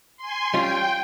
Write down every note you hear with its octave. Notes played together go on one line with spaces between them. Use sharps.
G#5 C6
G3 C#4 F4 G5